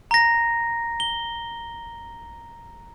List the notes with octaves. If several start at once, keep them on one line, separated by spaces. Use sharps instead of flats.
A#5 A#6
G7